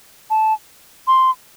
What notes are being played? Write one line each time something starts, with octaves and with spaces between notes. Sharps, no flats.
A5
C6